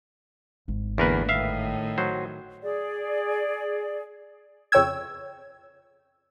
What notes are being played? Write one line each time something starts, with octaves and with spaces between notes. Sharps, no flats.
G#1
E2 D3 A#3 A#4 B4
A2 D#3 E5 F5
F#3 C5
G#4 D5
F2 C#3 C#5 G5 E6 G#6